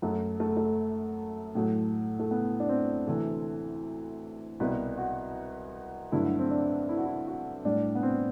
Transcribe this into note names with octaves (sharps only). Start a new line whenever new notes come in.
F#2 F#3 A3
A3
A3
A2 F#3 A3
A3
B3
D4
C4
D2 C3 E3 A4
C2 B2 G3 B4
F#4
G2 D3 F#3 A3 E4
C4
D4
E4
F#4
E4
F#4
A2 G3 D4
B3
C4